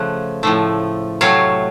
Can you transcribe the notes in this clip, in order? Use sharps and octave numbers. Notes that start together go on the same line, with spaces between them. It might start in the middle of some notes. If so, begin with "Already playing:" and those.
Already playing: C#3 F3 A3 F#5
A2 F3 A3
C3 F#3 A3 C#5 F5